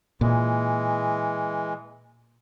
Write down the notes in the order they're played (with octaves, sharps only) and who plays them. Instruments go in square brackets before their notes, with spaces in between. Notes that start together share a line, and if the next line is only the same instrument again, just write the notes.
[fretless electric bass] A#2 [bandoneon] E3 G#3